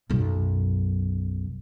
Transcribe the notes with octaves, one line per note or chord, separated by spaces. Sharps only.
B1 F#2